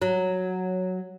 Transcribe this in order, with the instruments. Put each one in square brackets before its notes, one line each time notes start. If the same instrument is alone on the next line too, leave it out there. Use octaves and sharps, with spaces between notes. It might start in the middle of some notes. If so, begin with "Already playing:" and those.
[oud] F#3